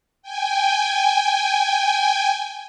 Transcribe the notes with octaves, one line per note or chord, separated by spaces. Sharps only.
G5 G#5